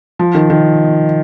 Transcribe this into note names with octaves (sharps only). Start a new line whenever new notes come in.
F3
D#3
D#3